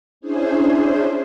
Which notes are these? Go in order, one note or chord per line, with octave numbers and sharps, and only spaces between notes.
C#4 D4 E4 G#4 C5